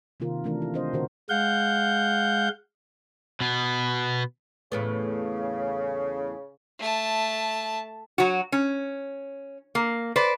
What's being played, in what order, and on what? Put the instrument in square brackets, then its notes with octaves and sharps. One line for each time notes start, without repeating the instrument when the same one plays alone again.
[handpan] C3 D#3 A#3 F4 A#4
E3 A3 D4 A#4
F4
C4 D4 C5 D#5
B2 D3 D#3 F#4 A#4 C5
[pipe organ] G#3 F5 F#5 G6
[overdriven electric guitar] B2 B3
[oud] E2 A2 B3 [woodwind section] C#3
[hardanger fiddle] A3 A5
[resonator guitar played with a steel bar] F#3 F#4
C#4
A#3
B4 C5 D5